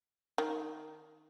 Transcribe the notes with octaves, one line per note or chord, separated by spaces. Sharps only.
D#3